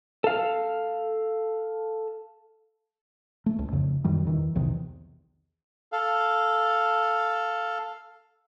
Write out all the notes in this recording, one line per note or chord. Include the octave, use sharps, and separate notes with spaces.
A4 F5
A3
C#2
F2 C#3
F#2 D#3 G3
E2 D#3 E3
B1 E2 C3 D#3
A4 F5